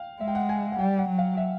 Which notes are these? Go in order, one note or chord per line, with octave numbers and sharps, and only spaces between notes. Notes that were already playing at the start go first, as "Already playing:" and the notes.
Already playing: F5 G5
G#3 E5
G5
F#5
G#5
F#5
G3 G5
F#5
F#3
F5
E5